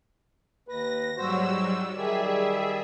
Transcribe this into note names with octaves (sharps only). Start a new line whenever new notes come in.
D#2 B4 A#6
G#2 F#3 G3 F#4 C5 E6
D#3 G3 G#4 D5 E5